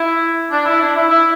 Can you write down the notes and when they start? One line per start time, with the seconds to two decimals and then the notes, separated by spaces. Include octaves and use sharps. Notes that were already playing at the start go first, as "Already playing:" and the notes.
Already playing: E4
0.51 D4
0.66 E4
0.80 D4
0.95 E4
1.09 E4